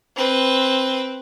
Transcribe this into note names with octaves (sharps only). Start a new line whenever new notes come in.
C4 B4